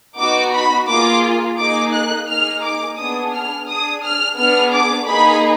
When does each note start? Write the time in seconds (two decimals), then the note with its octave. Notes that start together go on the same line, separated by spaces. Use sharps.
0.18 B3 D#4 F#4 D6
0.53 B5
0.88 A#3 F4 G#4 D6
1.58 A#3 D#4 G#4 D6
1.94 F#6
2.28 A#3 D#4 G#4 F6
2.63 D6
2.98 B3 D4 G#4 D#6
3.34 F6
3.68 D4 G#4 D#6
4.04 F6
4.38 B3 D4 G#4 F6
4.74 D6
5.08 A#3 D#4 G#4 B5